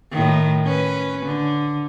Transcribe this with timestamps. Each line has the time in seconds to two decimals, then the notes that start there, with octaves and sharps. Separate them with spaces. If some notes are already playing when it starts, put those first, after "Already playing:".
0.12 A2 D#3
0.65 C#4 B4
1.26 D3